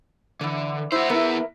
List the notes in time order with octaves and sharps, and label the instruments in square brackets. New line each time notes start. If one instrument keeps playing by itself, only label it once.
[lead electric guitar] D3 [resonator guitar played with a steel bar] E3 D5
[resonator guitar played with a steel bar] E4 [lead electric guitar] F#4 C5
[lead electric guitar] B3 E4 [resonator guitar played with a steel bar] A#4 B4 E5